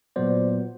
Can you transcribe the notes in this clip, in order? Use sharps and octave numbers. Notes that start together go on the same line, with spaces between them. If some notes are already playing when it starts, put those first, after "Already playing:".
A#2 F#3 B3 C5 D5